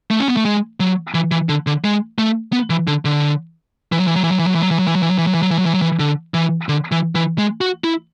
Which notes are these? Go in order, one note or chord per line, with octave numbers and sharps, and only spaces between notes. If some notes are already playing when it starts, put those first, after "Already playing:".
A3
C#4
B3
A3
G#3
F#3
E3
E3
D3
D3
G#3
A3
B3
E3
D3
D3
E3
F#3
E3
F#3
E3
F#3
E3
F#3
E3
F#3
E3
F#3
E3
F#3
E3
F#3
E3
F#3
E3
F#3
E3
F#3
E3
F#3
E3
D3
E3
D3
E3
E3
G#3
F#4
E4